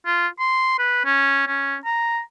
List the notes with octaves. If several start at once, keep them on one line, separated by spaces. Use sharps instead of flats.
F4
C6
B4
C#4
C#4
A#5